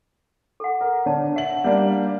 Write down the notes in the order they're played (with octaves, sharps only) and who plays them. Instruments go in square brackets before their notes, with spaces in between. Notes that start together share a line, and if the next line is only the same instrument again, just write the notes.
[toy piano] A4 F#5
[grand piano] A#4
[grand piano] D3 [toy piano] C#5 D5 A5
[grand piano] E5 F#7 [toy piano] F#5
[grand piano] G3 A#3 D4